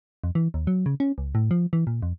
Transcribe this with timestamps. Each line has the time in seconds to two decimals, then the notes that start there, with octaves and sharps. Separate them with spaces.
0.24 F2
0.35 E3
0.54 D#2
0.67 F#3
0.86 C#3
1.00 C#4
1.18 C#2
1.35 A2
1.51 F3
1.73 E3
1.87 A#2
2.02 F2